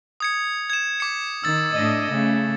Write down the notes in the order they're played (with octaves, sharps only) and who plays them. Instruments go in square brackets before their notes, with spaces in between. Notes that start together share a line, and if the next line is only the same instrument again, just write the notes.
[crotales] D#6 G#6 C#7
G#6 E7
D6 C#7
[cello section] D#3 [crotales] E6 A6
[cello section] A2 D4 D#5
C#3 A3